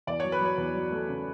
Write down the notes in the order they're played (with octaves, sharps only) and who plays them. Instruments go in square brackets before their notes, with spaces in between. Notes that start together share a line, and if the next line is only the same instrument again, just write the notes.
[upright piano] E2 [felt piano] D5
[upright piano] F#3 [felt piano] C#5
[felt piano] B4
[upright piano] F#3 [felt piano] C#5
[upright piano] E2
F#3
A3
C#3